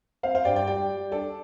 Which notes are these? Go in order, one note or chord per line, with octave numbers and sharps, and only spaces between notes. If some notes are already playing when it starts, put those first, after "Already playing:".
C4 C5 F5
C5 F5
G2 D5 G5
D5 G5
G3 D5 G5
G3
D4 A4 D5